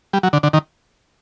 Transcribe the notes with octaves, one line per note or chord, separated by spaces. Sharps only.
G3
F#3
D3
D3
D#3